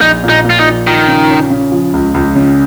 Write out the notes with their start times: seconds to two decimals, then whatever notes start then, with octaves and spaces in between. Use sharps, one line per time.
0.01 A#1 D#4
0.23 A#2
0.29 D#4
0.45 A#2
0.50 F4
0.59 D#4
0.66 F3
0.87 D#3 F3
1.07 C#3
1.30 C#4
1.50 C#3
1.72 F3
1.93 C#2
2.14 C#2
2.36 C#3